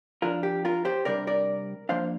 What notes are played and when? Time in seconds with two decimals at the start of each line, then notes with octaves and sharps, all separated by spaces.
0.22 F2 F3 D4 F4 A#4
0.43 G4
0.65 F4 A#4
0.85 G4 C5
1.05 C2 C3 G3 D4 A#4 D5
1.27 A#4 D5
1.89 F2 F3 A#3 D4 C5 F5